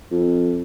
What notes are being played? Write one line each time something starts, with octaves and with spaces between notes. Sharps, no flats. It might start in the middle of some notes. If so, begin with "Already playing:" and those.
F2